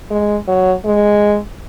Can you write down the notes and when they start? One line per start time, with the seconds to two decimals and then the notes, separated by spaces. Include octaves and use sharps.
0.10 G#3
0.48 F#3
0.85 G#3